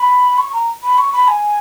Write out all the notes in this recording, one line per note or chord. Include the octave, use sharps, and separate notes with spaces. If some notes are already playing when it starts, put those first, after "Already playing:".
Already playing: B5
C#6
A#5
B5
C#6
B5
G#5